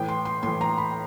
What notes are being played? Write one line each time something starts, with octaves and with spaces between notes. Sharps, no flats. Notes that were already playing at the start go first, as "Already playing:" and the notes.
Already playing: A2 E3 G5
C6
C6
A2 E3 C6
A#5
B5